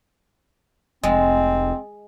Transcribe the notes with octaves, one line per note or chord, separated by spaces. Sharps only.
F1 G#3 C4 D#5